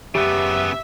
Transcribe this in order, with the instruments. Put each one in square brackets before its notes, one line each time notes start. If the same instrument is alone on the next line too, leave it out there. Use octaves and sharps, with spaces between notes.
[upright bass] F#2 [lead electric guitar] C#3 B3 [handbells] G4 [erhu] E5